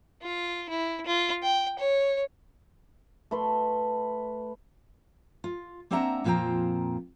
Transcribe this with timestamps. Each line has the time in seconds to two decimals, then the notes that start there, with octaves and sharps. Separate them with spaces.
0.22 F4
0.69 E4
1.06 F4
1.42 G5
1.79 C#5
3.31 A3 B4 C6
5.44 F4
5.90 A#3 C4 D4 E5 F#5 A#5
6.24 F2 A#2 F3 C4 G5 A#5